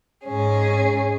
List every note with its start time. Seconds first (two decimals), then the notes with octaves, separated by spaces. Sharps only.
0.24 G#2 C#4 G#4